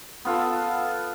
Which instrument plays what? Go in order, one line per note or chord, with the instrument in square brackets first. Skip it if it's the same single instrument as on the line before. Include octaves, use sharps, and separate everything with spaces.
[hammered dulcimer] B3 F4 A4